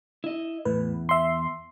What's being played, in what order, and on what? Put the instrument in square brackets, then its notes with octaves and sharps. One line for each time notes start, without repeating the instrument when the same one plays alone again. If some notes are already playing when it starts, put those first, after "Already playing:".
[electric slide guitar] E4 D#5
[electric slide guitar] E2 [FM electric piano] A2 B4
[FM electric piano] E5 C6